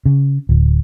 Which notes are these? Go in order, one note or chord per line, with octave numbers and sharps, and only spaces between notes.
C#3
D1